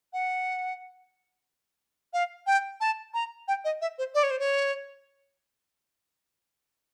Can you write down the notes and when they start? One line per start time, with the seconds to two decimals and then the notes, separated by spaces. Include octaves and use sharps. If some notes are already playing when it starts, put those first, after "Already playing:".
0.13 F#5
2.13 F5
2.47 G5
2.81 A5
3.14 A#5
3.48 G5
3.65 D#5
3.81 E5
3.98 C5
4.15 D5
4.23 C#5
4.31 C5
4.39 C#5